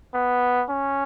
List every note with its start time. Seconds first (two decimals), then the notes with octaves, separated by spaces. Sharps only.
0.15 B3
0.70 C#4